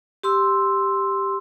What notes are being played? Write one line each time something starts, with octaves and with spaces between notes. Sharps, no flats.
G4 C6 E6